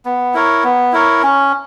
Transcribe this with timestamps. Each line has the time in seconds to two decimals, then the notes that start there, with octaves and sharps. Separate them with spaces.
0.05 B3
0.34 E4 A#4 C#5
0.64 B3
0.93 E4 A#4 C#5
1.23 C#4